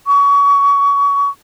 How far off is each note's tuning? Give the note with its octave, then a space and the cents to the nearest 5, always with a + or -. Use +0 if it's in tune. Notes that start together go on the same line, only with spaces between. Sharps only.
C#6 +30